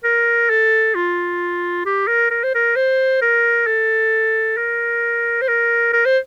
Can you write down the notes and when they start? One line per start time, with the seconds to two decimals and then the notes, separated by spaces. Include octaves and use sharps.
0.04 A#4
0.50 A4
0.95 F4
1.86 G4
2.07 A#4
2.31 A#4
2.44 C5
2.55 A#4
2.76 C5
3.22 A#4
3.67 A4
4.57 A#4
5.41 C5
5.48 A#4
5.93 A#4
6.06 C5